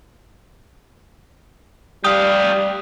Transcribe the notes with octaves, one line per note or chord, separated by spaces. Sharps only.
G3 G4 F5 D#6